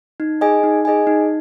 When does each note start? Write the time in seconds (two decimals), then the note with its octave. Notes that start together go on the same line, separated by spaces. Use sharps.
0.20 D#4
0.41 G#4 D#5 G#5
0.63 D#4
0.85 G#4 D#5 G#5
1.07 D#4